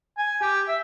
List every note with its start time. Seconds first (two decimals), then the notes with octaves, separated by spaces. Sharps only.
0.18 G#5
0.41 G4
0.68 E5